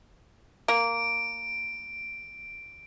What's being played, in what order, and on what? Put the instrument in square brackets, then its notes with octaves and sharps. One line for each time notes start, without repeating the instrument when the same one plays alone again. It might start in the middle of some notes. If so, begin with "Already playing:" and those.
[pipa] A#3 [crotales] D7